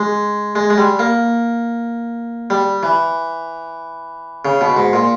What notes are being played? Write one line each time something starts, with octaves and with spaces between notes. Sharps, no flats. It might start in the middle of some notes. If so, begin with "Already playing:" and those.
Already playing: G#3
G#3
G#3
G3
A#3
G3
E3
C#3
B2
G#2
A#2